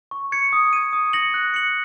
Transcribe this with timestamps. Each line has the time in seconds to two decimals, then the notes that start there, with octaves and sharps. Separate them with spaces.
0.11 C#6
0.32 G#6 C#7
0.53 D#6
0.73 G#6 D#7
0.93 D#6
1.13 A#6 C#7 F#7
1.34 F#6
1.54 C#7 F#7